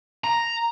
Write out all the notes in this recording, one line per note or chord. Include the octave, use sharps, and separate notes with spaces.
A#5